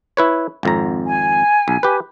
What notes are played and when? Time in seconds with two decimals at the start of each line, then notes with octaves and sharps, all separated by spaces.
0.17 E4 B4 C#5
0.63 G#1 F2 A#5
1.05 G#5
1.68 B1
1.83 G4 B4